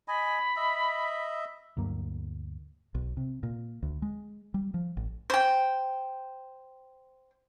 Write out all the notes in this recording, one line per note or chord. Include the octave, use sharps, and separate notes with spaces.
D#5 G#5 B5
D#5 E5
D2 G2 F#3 A#3
B1
C3
A#2
D2
G#3
G3
F3
A1
C5 G5